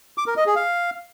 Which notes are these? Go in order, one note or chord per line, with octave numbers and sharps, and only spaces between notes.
D6
A#4
D#5
G#4
F5